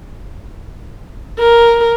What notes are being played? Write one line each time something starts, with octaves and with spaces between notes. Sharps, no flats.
A#4